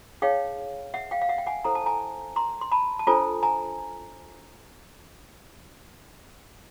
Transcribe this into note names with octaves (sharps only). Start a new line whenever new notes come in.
D#4 G#4 C#5 F5 G5
E5 F#5
F5 G5
F5
E5 F#5
G5
F#5 G#5
E4 A4 C5 A#5
A5
G#5 A#5
A#5 C6
C6
A5 B5
A5
D4 F4 A4 C5 G#5 A#5
G#5 A#5